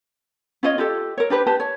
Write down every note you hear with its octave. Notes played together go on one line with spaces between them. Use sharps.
C#4 F4 C#5 D#5
F4 G4 A4
A#4 C#5
D4 G4 B4 C5
G4 B4 A5
C#5